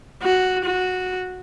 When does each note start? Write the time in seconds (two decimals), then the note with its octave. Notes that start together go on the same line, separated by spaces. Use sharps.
0.23 F#4
0.64 F#4